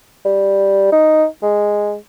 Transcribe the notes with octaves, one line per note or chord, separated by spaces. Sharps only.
G3
D#4
G#3